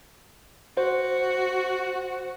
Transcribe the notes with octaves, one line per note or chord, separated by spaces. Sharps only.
F#4 C5